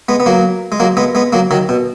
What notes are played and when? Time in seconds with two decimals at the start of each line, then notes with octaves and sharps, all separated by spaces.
0.08 G#3 B3
0.20 B3
0.26 F#3 A#3
0.72 G#3
0.80 F#3 A#3
0.97 G#3 B3
1.15 G#3 B3
1.33 F#3 A#3
1.51 D#3 F#3
1.69 B2